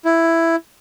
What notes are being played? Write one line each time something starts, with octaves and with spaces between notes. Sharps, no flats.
E4